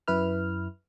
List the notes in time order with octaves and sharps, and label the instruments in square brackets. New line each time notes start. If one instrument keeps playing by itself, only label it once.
[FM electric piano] F#2 E4 B4 F6